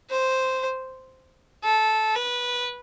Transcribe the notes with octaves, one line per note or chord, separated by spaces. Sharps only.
C5
A4
B4